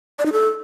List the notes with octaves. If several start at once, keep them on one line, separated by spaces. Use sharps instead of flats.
D5
D#4
A4